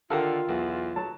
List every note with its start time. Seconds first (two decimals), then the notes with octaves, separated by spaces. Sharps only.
0.11 D3 D#3 F4 G4 A4 F5 A#5
0.49 B1 E2
0.96 F#3 A5